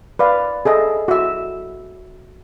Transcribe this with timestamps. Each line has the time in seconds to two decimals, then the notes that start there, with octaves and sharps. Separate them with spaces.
0.19 B4 D5 F5
0.65 G#4 A4 D#5 E5
1.08 F#4 E5